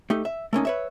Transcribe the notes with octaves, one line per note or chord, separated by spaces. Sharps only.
A3 D#4 G4
E5
A3 A#3 C#4 D#4
B4 C#5 E5